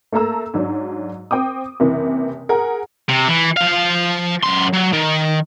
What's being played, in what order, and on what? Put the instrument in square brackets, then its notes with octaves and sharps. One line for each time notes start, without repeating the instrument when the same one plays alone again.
[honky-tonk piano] A3 A#3 A4 A#5 E6
G#2 F#3 D4
C4 G5 D6 D#6
F#1 C3 E3
G#4 A#4 F#5
[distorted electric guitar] C3
E3
F3 F5
F#2 C6
F#3
D#3